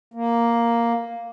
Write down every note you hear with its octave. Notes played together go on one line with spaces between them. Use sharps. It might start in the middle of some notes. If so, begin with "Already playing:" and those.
A#3